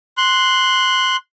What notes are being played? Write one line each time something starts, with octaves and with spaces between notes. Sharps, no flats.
C6 F#6